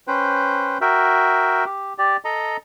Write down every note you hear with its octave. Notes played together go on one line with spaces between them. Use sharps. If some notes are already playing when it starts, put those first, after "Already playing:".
C#4 B4 C5 G5
F#4 A#4 E5 G5
G4
G4 D5
A4 D#5 A#5